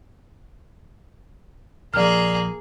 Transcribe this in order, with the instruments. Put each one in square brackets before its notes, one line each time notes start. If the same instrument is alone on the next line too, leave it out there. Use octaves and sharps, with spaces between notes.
[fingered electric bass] A#1 F3 [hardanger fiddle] A#3 G#4 [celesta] D5 F6